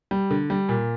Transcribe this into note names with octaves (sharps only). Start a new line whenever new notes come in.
G3
D3
G3
A#2